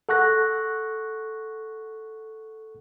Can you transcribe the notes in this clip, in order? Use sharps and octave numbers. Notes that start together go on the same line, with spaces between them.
A4 F#5 C#6 F#6 A#6